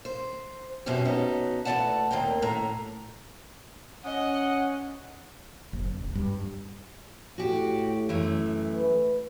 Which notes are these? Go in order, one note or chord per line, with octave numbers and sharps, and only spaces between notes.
C5
F#2 B2 C4 C#4 G4
B3 C#4 D#4 F#4 A4
E3 A3 C4 D5 F#5 A5
D#2 A#3 C4 G5
A2 A#5
C#4 D#5 F#5
F#1
D1
G2
A2 F#4 G4
F#2 E3 A3
B4